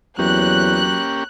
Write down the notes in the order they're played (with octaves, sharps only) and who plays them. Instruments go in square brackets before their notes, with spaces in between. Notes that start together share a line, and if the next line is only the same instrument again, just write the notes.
[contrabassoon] E2 [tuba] F#3 [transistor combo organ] A#3 C#4 G4 [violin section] F#6